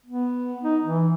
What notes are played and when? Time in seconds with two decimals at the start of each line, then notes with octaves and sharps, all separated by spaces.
0.06 B3
0.63 D#4
0.83 E3